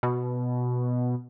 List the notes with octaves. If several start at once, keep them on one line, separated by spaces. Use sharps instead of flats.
B2